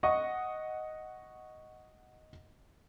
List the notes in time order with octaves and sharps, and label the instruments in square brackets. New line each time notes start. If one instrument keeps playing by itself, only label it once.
[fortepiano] D#5 F#5 C#6